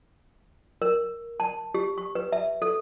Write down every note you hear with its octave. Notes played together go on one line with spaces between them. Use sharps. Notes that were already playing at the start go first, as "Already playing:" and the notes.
A#4
A5
G4
C#6
B4
E5
A4